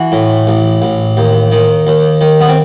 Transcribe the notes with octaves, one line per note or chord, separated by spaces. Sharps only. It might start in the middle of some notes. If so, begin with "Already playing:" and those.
Already playing: E3 F#4
A2
A1
A1
D#2
D#3
D#2
D#3
B3
C4